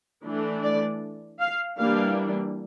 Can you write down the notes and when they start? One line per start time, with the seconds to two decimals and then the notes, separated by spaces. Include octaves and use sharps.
0.24 E3 A3 D4
0.62 D5
1.39 F5
1.78 E3 G3 A#3 D4 F5